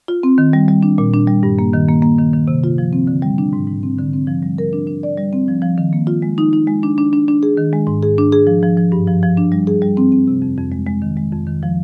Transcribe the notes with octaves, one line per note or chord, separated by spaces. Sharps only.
F4
C4
D#3
G3
G3
D4
A#2
D4
G3
G2
A#3
D#3
A#3
A#3
D#3
D#3
C3
F4
F3
C4
D3
G3
D4
G#2
G#2
C4
D3
C4
F3
G3
A#4
D4
D4
D5
G3
C4
F3
F3
D#3
A#3
F4
G#3
D#4
D#4
G#3
D4
D4
D4
D4
G#4
D#3
G#3
G#2
G#4
D4
G#4
F3
F3
F3
G2
F3
F3
D4
G3
G#4
G3
C4
C4
C3
F2
F2
G#3
G#3
D#3
G#3
F2
D#3
F3